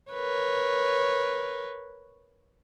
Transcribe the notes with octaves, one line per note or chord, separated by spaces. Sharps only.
A#4 B4 C#5